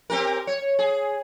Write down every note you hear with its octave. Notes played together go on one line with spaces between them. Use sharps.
C4 G4 A#4
C#5
G#4